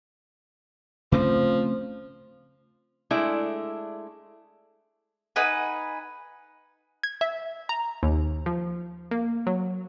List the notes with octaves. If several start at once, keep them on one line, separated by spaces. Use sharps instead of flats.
C#3 F3 A3 C4
G#3 A3 D4 E4
D#4 B4 F#5 G#5
G#6
E5
A#5
D#2
F3
A#3
F#3